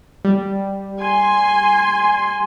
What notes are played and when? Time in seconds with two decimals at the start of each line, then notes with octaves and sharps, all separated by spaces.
0.25 G3
1.01 G#5 C6